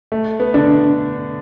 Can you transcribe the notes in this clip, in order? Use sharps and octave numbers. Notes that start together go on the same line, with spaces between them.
A3
B3
D3 D4